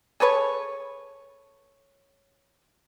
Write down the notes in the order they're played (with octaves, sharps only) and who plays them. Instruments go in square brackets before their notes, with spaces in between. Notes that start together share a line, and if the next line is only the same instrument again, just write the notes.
[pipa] G#4 A4 B4 C#5